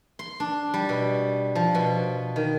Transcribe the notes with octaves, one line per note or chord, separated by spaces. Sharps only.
C6
D4
G3
B2
F3
B2
D#3